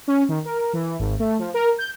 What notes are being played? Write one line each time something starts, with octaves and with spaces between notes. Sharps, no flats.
C#4
D#3
A#4
E3
G#1
A3
F3
A#4
G6